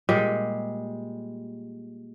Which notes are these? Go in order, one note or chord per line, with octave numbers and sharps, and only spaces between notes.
A#2 G3 G#3